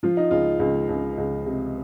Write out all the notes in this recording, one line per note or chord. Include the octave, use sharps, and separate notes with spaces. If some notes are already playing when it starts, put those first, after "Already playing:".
F3 F4
D#4
C#2 F4
C#2
C#2
C#2
C3